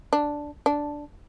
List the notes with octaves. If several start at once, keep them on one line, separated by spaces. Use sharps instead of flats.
D4
D4